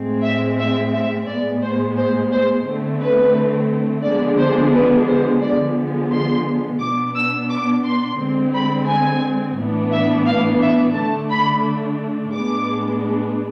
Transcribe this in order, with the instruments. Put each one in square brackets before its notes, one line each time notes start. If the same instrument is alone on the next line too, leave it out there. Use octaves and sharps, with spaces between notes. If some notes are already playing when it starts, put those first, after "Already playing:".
Already playing: [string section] A2 G#3 C4
E5
E5
E5
A2 G#3 B3 D5
C5
C5
C5
D3 A3 C4
B4
D3 F3 G#3 B3 D4 D5
C5
B4
C5
D3 F3 G#3 B3 D5
C6
B2 B3 D4 D6
E6
D6
C6
D3 G#3 C4
B5
G#5
A2 E3 B3 D4
E5
F5
E5
D3 A3 D4 A5
B5
A2 G#3 B3 D4 D6